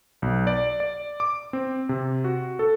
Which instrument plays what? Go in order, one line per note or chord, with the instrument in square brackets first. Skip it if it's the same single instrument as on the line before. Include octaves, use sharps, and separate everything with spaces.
[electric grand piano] B1
D5
D5
D6
C4
C3
F#4
A4